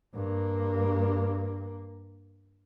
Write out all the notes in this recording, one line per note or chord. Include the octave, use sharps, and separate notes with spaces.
G2 A#3